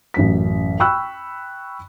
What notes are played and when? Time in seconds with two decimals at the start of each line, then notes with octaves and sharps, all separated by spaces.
0.14 A1 F#2 B6
0.80 G5 B5 C#6 E6 F#6